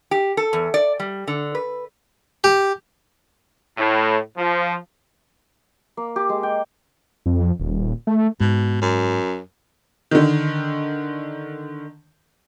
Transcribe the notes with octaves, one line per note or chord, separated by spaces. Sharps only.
G4
A4
E2
D5
G3
D3
B4
G4
A2
F3
A#3
G4
G#3
G5
F2
D#1
A3
G#2 B2
F#2
D3 D#3